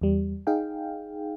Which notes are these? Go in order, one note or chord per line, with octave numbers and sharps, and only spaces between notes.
E2 G3
D#4 G#4 F5 G5